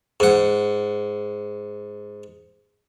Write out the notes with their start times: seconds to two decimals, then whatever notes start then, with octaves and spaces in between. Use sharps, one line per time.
0.20 G#2 F#5